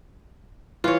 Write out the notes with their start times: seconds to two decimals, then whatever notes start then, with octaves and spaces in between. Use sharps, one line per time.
0.84 E3 F4 C#5